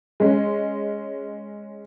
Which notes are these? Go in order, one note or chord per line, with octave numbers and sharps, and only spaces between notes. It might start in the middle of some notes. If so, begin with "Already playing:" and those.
G#3 C#4